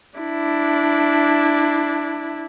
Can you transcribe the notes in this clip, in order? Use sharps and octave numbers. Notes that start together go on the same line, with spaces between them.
D4 E4